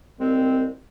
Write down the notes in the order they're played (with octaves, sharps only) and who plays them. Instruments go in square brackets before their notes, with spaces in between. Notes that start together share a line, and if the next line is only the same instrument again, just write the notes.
[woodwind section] C2 A#2 G#3 C4